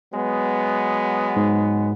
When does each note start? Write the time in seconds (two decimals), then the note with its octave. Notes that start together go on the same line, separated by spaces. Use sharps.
0.14 F#3 G#3 B3
1.36 G#2